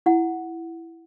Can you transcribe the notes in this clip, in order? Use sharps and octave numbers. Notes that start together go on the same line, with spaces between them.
E4 F#5